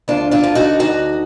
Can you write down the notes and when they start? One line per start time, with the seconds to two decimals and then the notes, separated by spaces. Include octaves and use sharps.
0.08 D2 D4 F4
0.31 D4 F4
0.44 D3
0.55 D#4 F#4
0.80 D2 D#4 F#4